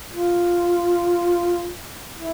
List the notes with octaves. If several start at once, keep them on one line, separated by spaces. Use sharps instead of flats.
F4
E4